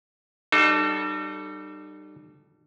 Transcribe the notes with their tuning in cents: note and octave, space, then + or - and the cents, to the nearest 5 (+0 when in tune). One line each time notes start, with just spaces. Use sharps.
G3 -25 D#4 -40 A4 +0